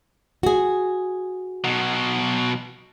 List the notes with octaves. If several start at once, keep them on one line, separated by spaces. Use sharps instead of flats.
F#4 G#4
B2 F#3